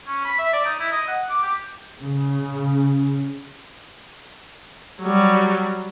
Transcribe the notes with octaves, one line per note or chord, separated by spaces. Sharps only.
C#4
B5
E5
D5
D#4
E4
D#5
F#5
D6
G4
C#3
F#3 G3